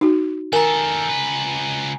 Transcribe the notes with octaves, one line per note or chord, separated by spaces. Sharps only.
D#4 F#4
D#3 A4 A#4 G#5 A#5
C#2 B4